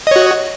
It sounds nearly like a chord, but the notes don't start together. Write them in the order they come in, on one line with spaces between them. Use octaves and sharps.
D#5 C#5 F#4